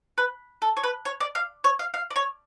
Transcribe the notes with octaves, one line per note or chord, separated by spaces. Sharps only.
B4
A4
C#5
B4
C#5
D5
F5
C#5
F5
F5
D5
C#5